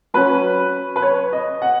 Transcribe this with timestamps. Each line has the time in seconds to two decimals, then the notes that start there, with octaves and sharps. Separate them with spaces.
0.14 F#3 C#4 B4
0.96 B4
1.02 C#5
1.32 D#5
1.62 F#5